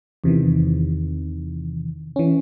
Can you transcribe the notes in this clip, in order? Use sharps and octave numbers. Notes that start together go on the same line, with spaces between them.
E2 C3 D#3 E3
E3 C#4